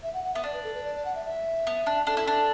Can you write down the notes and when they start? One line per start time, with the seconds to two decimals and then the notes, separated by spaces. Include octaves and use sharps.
0.03 E5
0.14 F#5
0.24 F#5
0.34 B3 E5
0.43 D4 D5
0.54 B4
0.64 A4
0.75 B4
0.84 D5
0.95 D5
1.05 F#5
1.15 E5
1.25 E5
1.67 B3
1.86 D4
2.07 D4 A4
2.17 E4
2.27 D4